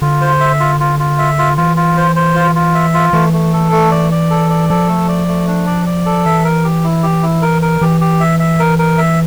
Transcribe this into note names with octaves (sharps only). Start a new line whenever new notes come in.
D3 F4
C5
E5
F4
F4
F4
E5
F4
E3 F4
F4
C5
C5
F4
F4
E5
F4
E3 A3
A3
A4
A3
D5
D5
A4
D5
F3 A4
A3
D5
A3
D4
D5
D5
A4
E3 E5
A#4
G4
E4
G4
E4
A#4
A#4
E3 G4
G4
E5
E5
A#4
A#4
E5